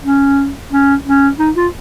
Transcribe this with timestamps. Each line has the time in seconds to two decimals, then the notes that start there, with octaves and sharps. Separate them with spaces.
0.04 C#4
0.72 C#4
1.06 C#4
1.39 D#4
1.56 F4